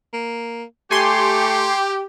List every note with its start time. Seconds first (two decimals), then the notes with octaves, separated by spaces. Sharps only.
0.13 A#3
0.91 A3 G4 G#5 C6